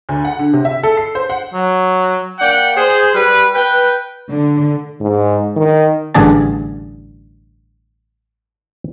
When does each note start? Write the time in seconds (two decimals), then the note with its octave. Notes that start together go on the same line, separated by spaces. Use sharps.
0.09 D2
0.25 F#5
0.39 D3
0.53 C3
0.65 E5
0.83 A4
0.97 C7
1.15 C5
1.30 F#5
1.54 F#3
2.40 A#3 D5 F#5 G5
2.77 G#4 C5
3.14 G3 B4
3.55 B4 G5
4.32 D3
5.00 G#2
5.56 D#3
6.15 A1 G2 D3 G#4 D5 A5